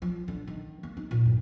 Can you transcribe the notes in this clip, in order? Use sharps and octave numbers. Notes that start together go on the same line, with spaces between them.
F3
D3
D#3
A#3
D#4
A#2
G2